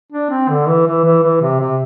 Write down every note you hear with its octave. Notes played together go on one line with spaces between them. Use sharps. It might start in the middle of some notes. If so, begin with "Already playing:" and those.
D4
C4
D3
E3
E3
E3
E3
C3
C3